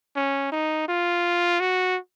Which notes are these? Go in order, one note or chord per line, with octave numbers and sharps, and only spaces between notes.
C#4
D#4
F4
F#4